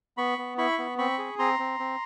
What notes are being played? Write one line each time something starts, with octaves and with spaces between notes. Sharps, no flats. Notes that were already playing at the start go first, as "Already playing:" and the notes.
B3 B5 C#6
B3
E4 B5 C#6
B3
C4 B5 C#6
G#4
C4 A#5 C6
C4
C4